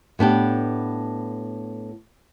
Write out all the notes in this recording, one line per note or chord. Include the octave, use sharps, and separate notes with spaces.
A2 B3 D4 G4